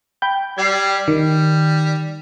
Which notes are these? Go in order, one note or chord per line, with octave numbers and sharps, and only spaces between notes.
G5 B5 G6
G3 D5 G#6 C7
D#3 G3